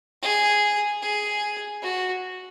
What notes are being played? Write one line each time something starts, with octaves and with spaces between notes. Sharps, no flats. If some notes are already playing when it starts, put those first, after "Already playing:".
G#4
G#4
F#4